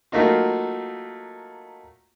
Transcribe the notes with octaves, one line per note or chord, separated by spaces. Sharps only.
F#3 A3 A#3 D#4 F4